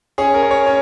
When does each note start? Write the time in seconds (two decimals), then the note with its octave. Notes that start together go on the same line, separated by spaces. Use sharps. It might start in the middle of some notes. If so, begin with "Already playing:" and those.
0.18 C#4 G#4
0.34 A#4
0.43 C#4
0.51 C#5
0.66 C#4